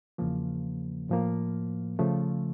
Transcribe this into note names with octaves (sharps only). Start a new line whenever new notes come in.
E2 C#3 F3 A#3
A2 F3 A#3
C#3 F3 A3